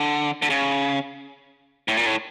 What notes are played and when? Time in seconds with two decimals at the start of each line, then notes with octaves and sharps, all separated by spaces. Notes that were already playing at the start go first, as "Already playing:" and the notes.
Already playing: D3
0.42 D3
0.50 C#3
1.88 A2
1.97 A#2
2.06 A2